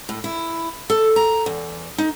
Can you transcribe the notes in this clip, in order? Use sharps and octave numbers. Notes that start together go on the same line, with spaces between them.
A2
E4
A4
A#5
E2
D#4